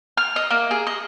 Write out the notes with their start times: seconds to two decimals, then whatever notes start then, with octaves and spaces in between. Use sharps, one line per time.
0.17 F6
0.36 D#5
0.51 A#3
0.71 G#4
0.87 D#5